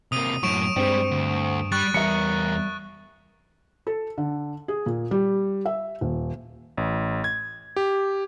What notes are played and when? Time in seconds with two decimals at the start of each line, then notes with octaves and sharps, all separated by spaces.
0.12 C3 A#3 D#6 D#7
0.43 F#2 A2 F#3 C#6 D7 E7
0.76 G2 G3 G#3 C4
1.11 D2
1.72 G3 C#6 F#6 A6
1.94 E2 G3 A#4 E5 C#7
3.87 A4
4.18 D3
4.68 G#4
4.86 A#2
5.11 G3
5.66 E5
6.01 D#1
6.77 A1
7.24 G#6
7.76 G4